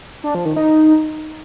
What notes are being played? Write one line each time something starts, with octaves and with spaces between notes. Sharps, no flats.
D4
F3
D#3
D#4